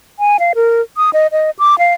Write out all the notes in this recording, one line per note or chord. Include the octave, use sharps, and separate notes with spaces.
G#5
F5
A#4
D#6
D#5
D#5
D6
F5